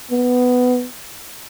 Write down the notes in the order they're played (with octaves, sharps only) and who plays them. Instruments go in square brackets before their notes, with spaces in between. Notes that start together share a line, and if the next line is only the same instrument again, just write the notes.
[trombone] B3